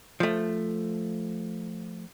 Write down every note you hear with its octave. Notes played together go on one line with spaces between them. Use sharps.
F3 A3